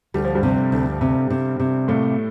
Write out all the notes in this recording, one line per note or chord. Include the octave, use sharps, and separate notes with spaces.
D2 G3
F3
G2 G3
C3
D2
C3
C3
C3
A2 A3 A#3